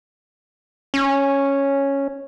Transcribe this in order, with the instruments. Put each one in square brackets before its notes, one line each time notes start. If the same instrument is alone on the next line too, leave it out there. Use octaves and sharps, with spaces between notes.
[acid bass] C#4